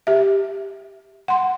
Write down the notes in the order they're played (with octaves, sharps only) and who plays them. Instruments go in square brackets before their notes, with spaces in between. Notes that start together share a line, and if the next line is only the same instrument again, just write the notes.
[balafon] G4 E5
F#5 C6